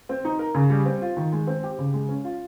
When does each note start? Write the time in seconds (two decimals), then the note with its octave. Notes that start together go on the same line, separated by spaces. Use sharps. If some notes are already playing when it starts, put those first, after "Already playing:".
0.09 C4
0.25 D#4
0.39 A#4
0.55 C#3
0.70 G3
0.86 C4
1.02 F4
1.17 D#3
1.32 G#3
1.47 C4
1.64 G4
1.78 C#3
1.94 G#3
2.09 C#4
2.24 F4